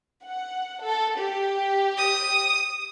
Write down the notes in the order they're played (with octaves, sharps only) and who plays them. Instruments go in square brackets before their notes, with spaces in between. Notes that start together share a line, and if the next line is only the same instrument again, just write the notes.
[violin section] F#5
A4
G4
[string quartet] D#6